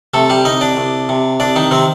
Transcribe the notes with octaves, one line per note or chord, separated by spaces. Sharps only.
C3 A3 A4
G3 G4
C2 D#4 D#5
D4 D5
C2
C3
C2 D4 D5
D#3 D#4
C3 D#3 C4